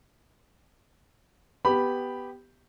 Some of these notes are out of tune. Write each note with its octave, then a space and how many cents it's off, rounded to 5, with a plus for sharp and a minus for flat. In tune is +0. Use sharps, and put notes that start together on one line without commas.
B3 +5 G4 +0 B5 +0